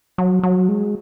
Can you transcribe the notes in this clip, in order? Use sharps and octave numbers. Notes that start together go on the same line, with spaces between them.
F#3
F#3
G#3